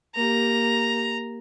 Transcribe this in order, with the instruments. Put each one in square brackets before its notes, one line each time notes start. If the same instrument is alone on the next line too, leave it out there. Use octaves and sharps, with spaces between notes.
[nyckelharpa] A#3 G4 [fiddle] A#5